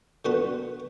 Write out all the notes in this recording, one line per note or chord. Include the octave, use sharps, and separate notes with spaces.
D3 B3 F#4 B4 F#5 B5